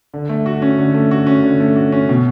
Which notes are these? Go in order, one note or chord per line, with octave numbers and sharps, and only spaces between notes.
D3
A3
F#4
C#4
D3
A3
F#4
C#4
D3
A3
F#4
C#4
B2